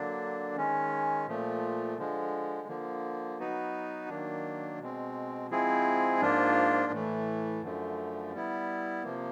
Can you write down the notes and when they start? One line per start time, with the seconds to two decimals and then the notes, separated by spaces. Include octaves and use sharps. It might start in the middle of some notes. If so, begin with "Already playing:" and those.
Already playing: D3 F#3 A#3 D4
0.56 D#3 G#3 C#4
1.27 A#2 F3 A3
1.98 D3 F3 G#3
2.68 D3 F3 A#3
3.38 F#3 B3 D#4 F#4 B4
4.09 D#3 F#3 A#3 D4
4.79 B2 G#3 C4
5.50 F3 G#3 C4 E4 G#4
6.21 G#2 F3 A#3 D4 F4
6.92 A2 E3 A3
7.63 F#2 D3 F3 A3
8.32 G3 B3 E4
9.03 C3 F3 A#3